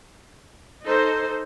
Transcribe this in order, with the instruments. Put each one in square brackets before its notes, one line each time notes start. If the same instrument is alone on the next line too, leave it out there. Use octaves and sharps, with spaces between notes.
[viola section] D#4 A4 C5